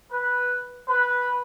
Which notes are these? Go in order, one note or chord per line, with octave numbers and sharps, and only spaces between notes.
B4
B4